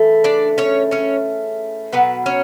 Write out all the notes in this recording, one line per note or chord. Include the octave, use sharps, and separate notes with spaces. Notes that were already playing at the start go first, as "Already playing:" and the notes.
Already playing: C#3 E3 A3
D4 D5
C#4 C#5
C#4 C#5
B2 F#3 B3 B4
C#4 C#5